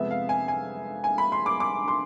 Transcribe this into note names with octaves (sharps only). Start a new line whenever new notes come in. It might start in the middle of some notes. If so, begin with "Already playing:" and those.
Already playing: F2 C3 G#3 B3 E5
F5
G#5
G#5
G#5
B5
C6
D6
D6
C6